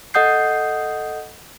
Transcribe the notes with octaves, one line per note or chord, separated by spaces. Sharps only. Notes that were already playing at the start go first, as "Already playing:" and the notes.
A4 D#5 F#5 D#6 G6 C7